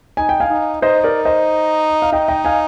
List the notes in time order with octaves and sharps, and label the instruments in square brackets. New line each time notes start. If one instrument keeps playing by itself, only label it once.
[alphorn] D#4 [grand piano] G#5
[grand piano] G5
F5 G#5
[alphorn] D#4
[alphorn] D#4 [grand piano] C5 D#5
[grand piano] A#4 D5
C5 D#5
F5
[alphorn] D#4 [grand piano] D#5 G5
[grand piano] D#5 G5
F5 G#5